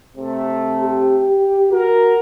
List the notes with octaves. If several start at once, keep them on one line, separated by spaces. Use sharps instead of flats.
C3 A3
G4
F#4 A#4